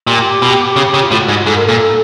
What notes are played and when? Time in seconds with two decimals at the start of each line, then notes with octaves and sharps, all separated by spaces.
0.07 A#2 G4
0.42 B2
0.76 C#3 G4
0.94 C#3
1.02 F4
1.11 A2 F#4
1.29 G#2
1.46 G#2 A4
1.55 A#4
1.64 A#2 A4